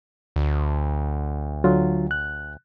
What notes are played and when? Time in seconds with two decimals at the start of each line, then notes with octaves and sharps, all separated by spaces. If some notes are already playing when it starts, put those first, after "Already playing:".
0.36 D2
1.64 D3 F#3 F4
2.11 F#6